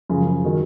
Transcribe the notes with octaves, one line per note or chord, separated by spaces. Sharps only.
F#2 C#3 F3
D#3 F#3